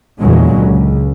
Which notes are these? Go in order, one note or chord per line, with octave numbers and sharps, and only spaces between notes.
E2 A#2 D3 F#3 G#3
C#2